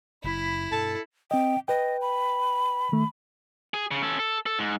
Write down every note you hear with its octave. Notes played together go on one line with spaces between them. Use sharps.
F#1 F#2 E4 B5
G2 B2 A4 A5
C4 D#5 G5
B4 D#5 G5
B5
D#3 A3
G#4
C#3
C#4 A4
A4
A4
G#2